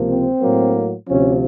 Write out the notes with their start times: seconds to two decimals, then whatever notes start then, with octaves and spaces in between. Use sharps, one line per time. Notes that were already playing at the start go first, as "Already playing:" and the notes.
Already playing: C#2 C3 F3 A#3
0.08 C4
0.41 A2 F#3 A#3
1.07 D2 C3 F3 C#4